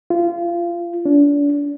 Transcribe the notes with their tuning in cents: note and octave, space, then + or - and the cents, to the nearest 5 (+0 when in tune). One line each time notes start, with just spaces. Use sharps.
F4 -25
D4 -35